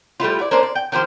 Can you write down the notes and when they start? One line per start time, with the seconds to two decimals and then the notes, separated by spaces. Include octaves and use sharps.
0.20 G3 A3 E4 F4
0.39 E4 D5
0.51 A#3 C#4 D4 C5
0.63 D5
0.75 G5
0.92 D#3 F3 G4 C5